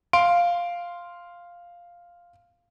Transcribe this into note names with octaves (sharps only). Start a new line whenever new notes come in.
F5 C6 D7